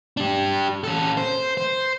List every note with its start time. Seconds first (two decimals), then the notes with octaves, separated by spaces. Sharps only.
0.17 D4 G4
0.84 C#4 A4
1.17 C5
1.57 C5